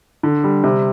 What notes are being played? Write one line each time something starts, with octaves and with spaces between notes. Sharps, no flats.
D3
G3
C3